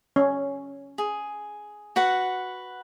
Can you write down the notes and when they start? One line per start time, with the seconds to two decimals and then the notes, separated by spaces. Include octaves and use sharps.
0.16 C#4
0.98 G#4
1.96 F#4 B4 F#5